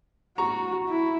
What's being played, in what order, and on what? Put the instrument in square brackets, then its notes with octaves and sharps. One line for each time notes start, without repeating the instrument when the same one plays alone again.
[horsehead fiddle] F#4 [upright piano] A#5 C#6
[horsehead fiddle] E4